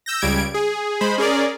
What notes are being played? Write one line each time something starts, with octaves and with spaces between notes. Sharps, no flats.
E6 G6 A#6
C#2 C#3 G3 G#6 D7
G#4
G#3 C5 B5
C#4 G#4 A#4 D5